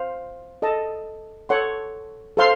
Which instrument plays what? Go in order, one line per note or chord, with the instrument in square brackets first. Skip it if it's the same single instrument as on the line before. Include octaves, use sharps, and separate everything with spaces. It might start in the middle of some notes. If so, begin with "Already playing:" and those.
Already playing: [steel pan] C5 F5
A4 D#5 A5
A4 C#5 F#5 C6
A4 C5 F5 C6